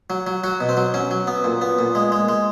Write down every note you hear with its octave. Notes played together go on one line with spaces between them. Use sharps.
F#3
F#3
F#3 F#4
B2
C4
F#3
F#3 C#4
F#3
B3
A#2
B3
A#2
G#3
G#3
G#3